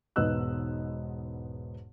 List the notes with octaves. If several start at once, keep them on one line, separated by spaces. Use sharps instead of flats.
E1 G#2 B3 D#5 E6 F#6